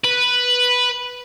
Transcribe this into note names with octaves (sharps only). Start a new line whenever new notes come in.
B4